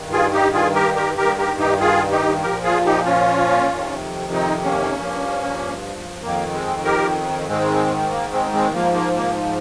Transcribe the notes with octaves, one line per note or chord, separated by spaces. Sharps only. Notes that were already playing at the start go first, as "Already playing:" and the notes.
Already playing: G2 D#3
F4 G#4
D#4 G4
F4 G#4
G4 A#4
G4 A#4
G2 D#3 G4 A#4
G4 A#4
D#4 G4
F4 G#4
D#4 G4
A#2 F3 G4 A#4
F4 G#4
D#4 G4
C#4 F4
F2 C3 D#3
C4 D#4
A#3 C#4
G2 F3
F2 D#3 A#3
G#3 C4
G4 A#4
G#2 D#3 G#3 C4
A#3
G#3 C4
G#3 C4
G#2 F3 A#3
A#3
A#3